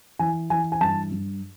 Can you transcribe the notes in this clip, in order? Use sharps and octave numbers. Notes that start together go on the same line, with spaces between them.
E3 G#5
E3 G#5
G#5
G2 A5
G2